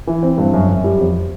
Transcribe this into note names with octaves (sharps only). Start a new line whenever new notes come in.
E3
C4
G2
F#2
F#2
G3
F2